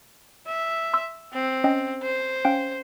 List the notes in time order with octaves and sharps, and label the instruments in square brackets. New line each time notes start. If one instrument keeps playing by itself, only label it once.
[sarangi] E5
[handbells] C6 E6
[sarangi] C4
[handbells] C#4 D#5 G5
[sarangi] C5
[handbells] C#4 F5 G5